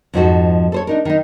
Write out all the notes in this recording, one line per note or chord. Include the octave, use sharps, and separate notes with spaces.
F2 G#2 F3 D#4 F#4 A4
A4 C5 C#5
D4 D#4 A#4
D#3 D#4